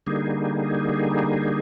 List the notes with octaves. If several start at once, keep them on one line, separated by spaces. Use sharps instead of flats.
D3 G3 A#3 D#4 G#4